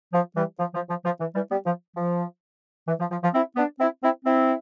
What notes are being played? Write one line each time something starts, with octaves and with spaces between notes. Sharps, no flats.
F3
E3 G3
F3
F3
F3
F3
E3
E3 G3
G3 B3
F3
F3
E3
F3
F3
F3
C4 E4
B3 D4
C4 E4
C4 E4
C4 E4